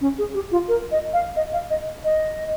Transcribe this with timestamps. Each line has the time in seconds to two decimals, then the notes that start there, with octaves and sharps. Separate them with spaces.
0.01 C#4
0.18 G#4
0.34 G4
0.52 F4
0.68 A#4
0.91 D#5
1.13 F5
1.36 D#5
1.53 F5
1.70 D#5
2.04 D#5